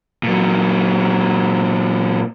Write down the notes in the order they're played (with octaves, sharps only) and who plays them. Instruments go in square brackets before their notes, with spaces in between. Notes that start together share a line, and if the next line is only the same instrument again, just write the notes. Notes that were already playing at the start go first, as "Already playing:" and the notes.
[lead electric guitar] A#2 F#3